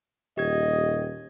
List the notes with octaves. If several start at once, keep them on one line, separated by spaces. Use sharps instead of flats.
D#1 G4 D#5 G#6